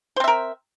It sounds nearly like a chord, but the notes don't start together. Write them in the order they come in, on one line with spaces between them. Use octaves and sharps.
C5 C4 E5 A#4